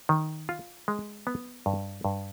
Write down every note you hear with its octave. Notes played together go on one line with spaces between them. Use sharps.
D#3
F4
G#3
B3
G2
G2